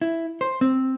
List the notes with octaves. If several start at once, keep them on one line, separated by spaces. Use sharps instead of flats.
E4
C5
C4